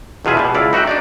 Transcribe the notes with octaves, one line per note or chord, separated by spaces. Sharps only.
E2 B2 F4 G#4 E5
B2 G3
C#2 E4 D5 F5
D#4 F#4 E5 F#5 G5
D4 D#4 D5